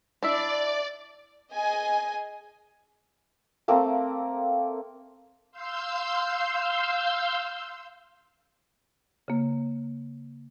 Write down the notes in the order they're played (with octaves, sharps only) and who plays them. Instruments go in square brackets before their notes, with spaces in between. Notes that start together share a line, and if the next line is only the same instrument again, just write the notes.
[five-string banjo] D4 E4 E5 [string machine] D5
[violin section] G#4 D#5 G#5
[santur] A3 A#3 C4
[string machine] F5 C6 E6 G6
[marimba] C#3 A#3